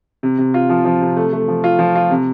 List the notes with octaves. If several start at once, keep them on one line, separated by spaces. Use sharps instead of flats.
C3
C3
F4
F3
F3
C3
A3
A3
F3
F4
F3
F4
C3